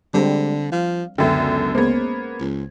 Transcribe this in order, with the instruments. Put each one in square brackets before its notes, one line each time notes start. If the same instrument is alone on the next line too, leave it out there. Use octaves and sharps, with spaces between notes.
[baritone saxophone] D3 [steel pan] G3 C4 D4 [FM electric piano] G#3 D5
[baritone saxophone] F3 [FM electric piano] F5
[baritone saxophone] C#2 [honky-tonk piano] F#2 D3 [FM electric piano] B3 E5 G5
[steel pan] G#3 C#4 [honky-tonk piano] A#3 B3 [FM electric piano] C5 G#6
[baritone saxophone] C#2